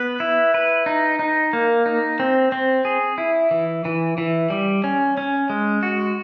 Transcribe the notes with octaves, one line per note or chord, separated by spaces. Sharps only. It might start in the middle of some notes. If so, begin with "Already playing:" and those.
Already playing: B3 B4
E4
B4
D#4
D#4
A#3
D#4
C4
C4
G#4
E4
E3
E3
E3
G3
C#4
C#4
G#3
F#4